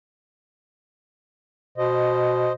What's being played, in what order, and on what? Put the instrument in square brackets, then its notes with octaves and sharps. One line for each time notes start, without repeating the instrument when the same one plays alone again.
[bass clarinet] B2 [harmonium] C5 D#5